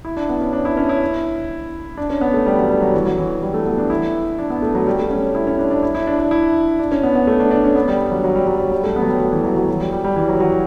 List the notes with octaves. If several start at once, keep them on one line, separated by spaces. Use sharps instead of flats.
E4
D4
B3
C#4
D4
E4
C#4
E4
D4
C#4
B3
A3
G3
F#3
G3
F#3
E3
F#3
E3
G3
A3
B3
D4
E4
D4
B3
A3
F#3
G3
A3
C#4
E4
C#4
D4
D4
E4
E4
D4
D4
E4
D4
C#4
B3
B3
A3
D4
D4
C#4
B3
G3
F#3
F#3
G3
F#3
F#3
G3
A3
B3
F#3
G3
F#3
E3
F#3
F#3
F#3
G3
G3
G3
E3
F#3
F#3